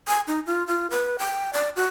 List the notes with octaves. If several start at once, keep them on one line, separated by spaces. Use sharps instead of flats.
G#5
D#4
F4
F4
B4
G5
D5
F#4